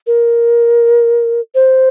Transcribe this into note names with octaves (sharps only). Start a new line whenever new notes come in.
A#4
C5